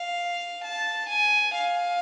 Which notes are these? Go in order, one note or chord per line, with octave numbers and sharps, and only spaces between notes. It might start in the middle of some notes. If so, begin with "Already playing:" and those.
Already playing: F5
A5
G#5
F5